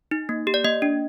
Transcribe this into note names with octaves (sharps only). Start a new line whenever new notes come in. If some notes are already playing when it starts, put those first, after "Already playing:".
D#4
A#3
G4
D5
A#3 D#5
D4